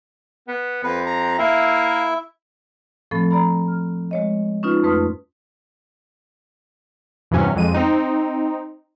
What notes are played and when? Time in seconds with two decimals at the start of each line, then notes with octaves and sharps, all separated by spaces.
0.48 B3
0.84 F2 B4
1.06 A#5
1.39 A#3 E4 E5
3.11 A2 F3 A3 C4 A4 B5
3.31 D5 A#5 B5
3.68 F6
4.11 G#3 C#5 D#5
4.63 C#4 D#4 F4 B4
4.83 F2 A3 B4 C6 D#6 F6
7.31 E2 G2 C3 F#3 C#4
7.56 F2 G#3 D#7
7.74 C4 D#4